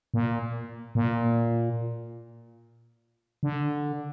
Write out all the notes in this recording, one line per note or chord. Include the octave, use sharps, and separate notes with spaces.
A#2
A#2
D3